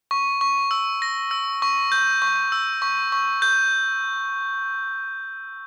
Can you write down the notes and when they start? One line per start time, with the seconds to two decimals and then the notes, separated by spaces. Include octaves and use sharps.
0.11 C#6
0.41 C#6
0.71 E6
1.02 A#6
1.31 E6
1.62 C#6
1.92 G6
2.22 C#6
2.52 E6
2.82 C#6
3.12 C#6
3.42 G6